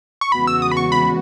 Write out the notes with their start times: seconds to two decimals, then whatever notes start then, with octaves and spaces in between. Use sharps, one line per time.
0.21 C#6
0.32 E2 C#3 G#3 B3 F#4 B5
0.47 E6
0.62 D#6
0.72 B5
0.77 C#6
0.92 B5